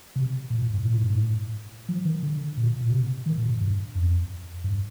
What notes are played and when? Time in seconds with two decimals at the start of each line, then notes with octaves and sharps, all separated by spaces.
0.16 C3
0.50 A#2
0.62 A2
0.73 G2
0.85 A#2
0.93 A2
1.02 G2
1.10 A2
1.89 F3
2.05 D#3
2.23 D3
2.57 A#2
2.81 A#2
2.92 C3
3.26 D#3
3.38 A#2
3.49 A2
3.61 G2
3.95 F2
4.64 G2